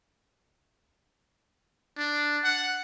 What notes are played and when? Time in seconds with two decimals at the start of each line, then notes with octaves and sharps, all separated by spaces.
1.98 D4
2.44 F#5